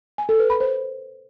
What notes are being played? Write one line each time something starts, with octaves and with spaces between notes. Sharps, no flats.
G#5
A4
B4
B5
C5